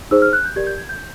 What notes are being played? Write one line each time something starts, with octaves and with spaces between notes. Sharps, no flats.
D#4 G#4 C5 E6
F6
F#6
G6
G4 A#4 D5 G#6
G6
G#6
G6